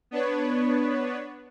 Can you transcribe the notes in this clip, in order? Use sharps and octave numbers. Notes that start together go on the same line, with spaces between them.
B3 D4 B4 C#5